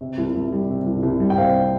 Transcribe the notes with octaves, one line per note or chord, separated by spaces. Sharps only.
C3
C2
C2
G3
C3
C2
C2
G3
G5
C3 C5 F5